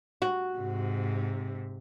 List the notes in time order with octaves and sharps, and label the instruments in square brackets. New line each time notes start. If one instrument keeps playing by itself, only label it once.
[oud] F#4
[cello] G#2 C3